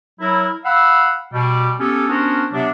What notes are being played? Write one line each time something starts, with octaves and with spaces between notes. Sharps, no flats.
F#3 E4 A#4
F5 F#5 B5 E6
B2 G3
B3 C#4 G4 A4
B3 C#4 D4 F#4 A#4 C5
C3 F#3 B3 D4